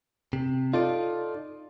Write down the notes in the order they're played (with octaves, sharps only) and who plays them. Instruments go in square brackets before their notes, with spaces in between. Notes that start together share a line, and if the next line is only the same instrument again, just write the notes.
[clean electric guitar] C3
[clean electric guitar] D#4 A4 D5 [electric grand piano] F4